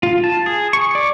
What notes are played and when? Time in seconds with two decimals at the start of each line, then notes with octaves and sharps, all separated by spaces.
0.03 F4
0.24 A5
0.46 G#4
0.73 C#6
0.95 D5